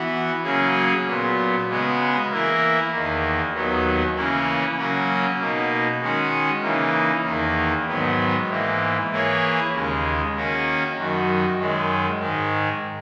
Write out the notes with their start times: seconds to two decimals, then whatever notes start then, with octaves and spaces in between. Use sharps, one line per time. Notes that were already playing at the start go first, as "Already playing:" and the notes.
Already playing: E3 B3 F#4
0.43 C#3 F#3 A#3 C#4 G#4
1.06 A#2 F#3 B3
1.68 C#3 G#3 B3 F#4
2.30 E3 A#3 E4 A#4
2.92 E2 D#3 A#3
3.53 D#2 D#3 F#3 B3
4.15 C#3 E3 A#3 C#4 E4
4.77 C#3 F#3 A#3 C#4 F#4
5.38 B2 A#3 D#4
6.01 D#3 G#3 C#4 F#4
6.62 C#3 E3 A#3 D#4
7.24 E2 D#3 A#3
7.87 G#2 D#3 F#3 B3
8.49 G#2 E3 A#3
9.10 E3 A#3 E4 G#4 C#5
9.72 D#2 C#3 G#3
10.34 D#3 A#3 C#4 F#4
10.96 F#2 D#3 F#3
11.58 F#2 D#3 G#3
12.19 G#2 D#3 G#3